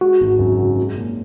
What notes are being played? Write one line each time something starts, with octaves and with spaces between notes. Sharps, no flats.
G#3 F#4
G#1
F#2
C#3
G#3
A#2